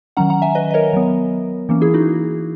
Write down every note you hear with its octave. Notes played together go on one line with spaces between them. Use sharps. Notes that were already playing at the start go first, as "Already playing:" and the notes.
D#3 F#3 C#4 F#5 A#5
F#5 A#5
E5 G#5
B4 D#5
D#5
A#4 C#5
F#3 B3
E3 A#3 C#4
E4 G#4
D#4 F#4